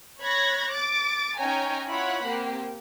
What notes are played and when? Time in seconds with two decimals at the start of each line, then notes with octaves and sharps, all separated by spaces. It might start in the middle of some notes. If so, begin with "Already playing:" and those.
0.21 C#5 B5 F#6 G#6 A#6
0.72 D6 A6 D7
1.38 C#4 D#4 C#5 G5 G#5 A#5
1.89 E4 F4 C#5 F#5 B5
2.26 A#3 C4 G4